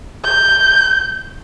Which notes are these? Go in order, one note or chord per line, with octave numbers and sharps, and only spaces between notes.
G6